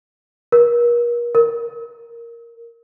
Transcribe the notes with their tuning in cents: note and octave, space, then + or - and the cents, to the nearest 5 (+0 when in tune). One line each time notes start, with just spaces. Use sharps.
A#4 +40
A#4 +0